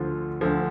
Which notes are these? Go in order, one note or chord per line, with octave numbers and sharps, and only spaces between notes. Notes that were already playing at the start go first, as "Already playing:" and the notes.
Already playing: D2 D3 F3 F4
D2 D3 F3